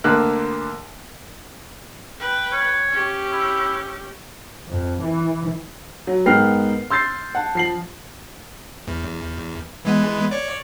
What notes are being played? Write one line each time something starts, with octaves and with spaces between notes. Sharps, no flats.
D2 D3 A#3 F#6
B4 G5
C#5
C#4 G4
E4
F2
E3
F#3
G#2 B3 A#4 G5 F6 C7
C6 E6 G6 A6 C7
F#5 A5
F3 C7 F#7
E2
E3 G#3 B3
C#5 D5